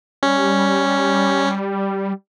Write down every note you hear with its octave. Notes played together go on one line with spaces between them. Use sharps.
G3 C#4